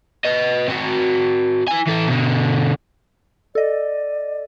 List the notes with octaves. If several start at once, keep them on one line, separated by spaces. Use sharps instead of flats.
B4 D#5
C4 F#4
E4 G#5
E3 A4
B2 D3
A4 D5 D#5